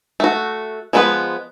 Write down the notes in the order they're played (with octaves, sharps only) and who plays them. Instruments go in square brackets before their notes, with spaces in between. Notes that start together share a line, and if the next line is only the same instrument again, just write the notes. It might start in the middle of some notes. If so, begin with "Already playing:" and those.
[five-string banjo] A3 F#4
F3 G#3 B3 F#4 B4